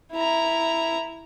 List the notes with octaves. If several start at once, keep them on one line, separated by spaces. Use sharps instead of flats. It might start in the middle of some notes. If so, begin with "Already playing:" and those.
E4 A#5